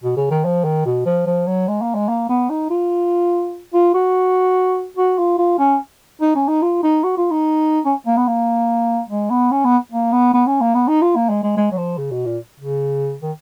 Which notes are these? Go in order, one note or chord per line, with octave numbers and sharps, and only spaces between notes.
B2
C#3
D#3
F3
D#3
B2
F3
F3
F#3
G#3
A#3
G#3
A#3
B3
D#4
F4
F4
F#4
F#4
F4
F4
C#4
D#4
C#4
D#4
F4
D#4
F#4
F4
D#4
C#4
A#3
B3
A#3
G#3
B3
C#4
B3
A#3
B3
B3
C#4
A#3
B3
D#4
F4
A#3
G#3
G#3
G#3
F#3
F3
C#3
B2
A#2
C#3
D#3